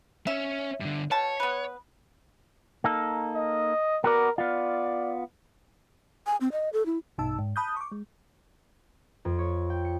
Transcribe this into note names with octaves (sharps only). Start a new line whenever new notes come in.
C#4 E5
G2 D3
B2 C#5 A5
B3 B4
A#3 D#4 A4
D#5
B3 F#4 A#4 D5
B3 F4 D5
G#5
C4
D#5
A4
E4
A#1 G2 B2 D#4 A5 E6
G#2
A5 B5 D#6 F#6 G6
C#6 D6
G#3
F2
C#5
G5
C#7